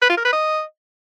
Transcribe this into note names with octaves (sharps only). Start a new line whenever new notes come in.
B4
F4
A#4
B4
D#5